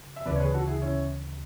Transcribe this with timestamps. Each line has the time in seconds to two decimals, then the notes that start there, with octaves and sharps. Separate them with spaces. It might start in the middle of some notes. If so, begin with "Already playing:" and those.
Already playing: C#3
0.16 E5
0.25 D2 C#3 E3 B3 B4 D5
0.36 C#5
0.40 G#4 B4
0.53 F#4 A4
0.67 E4 G#4
0.82 C#4 E4